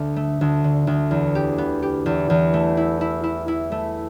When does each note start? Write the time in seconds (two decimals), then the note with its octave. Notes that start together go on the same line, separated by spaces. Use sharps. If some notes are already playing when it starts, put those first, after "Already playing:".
Already playing: D2
0.16 A3
0.41 D2
0.64 D3
0.87 D2
1.11 E2
1.35 G4
1.58 B3
1.83 G4
2.06 E2
2.30 E2
2.54 A3
2.77 E4
3.01 E4
3.24 E4
3.48 E4
3.72 A3